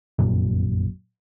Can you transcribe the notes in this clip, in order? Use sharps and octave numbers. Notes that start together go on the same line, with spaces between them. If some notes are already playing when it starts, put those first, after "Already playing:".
F1 A#1 F#2 A#2